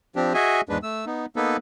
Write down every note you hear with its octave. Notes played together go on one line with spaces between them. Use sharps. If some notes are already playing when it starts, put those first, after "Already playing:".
F3 C4 D4 G4
F#4 G#4 D#5 E5 G#5
E2 G#2 G#3 D4 B4
A3 E6
B3 D#4
A#3 B3 D#4 A4 B4